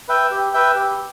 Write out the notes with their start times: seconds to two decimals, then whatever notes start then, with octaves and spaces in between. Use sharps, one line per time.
0.08 B4 E5 G5
0.31 G4
0.53 B4 E5 G5
0.75 G4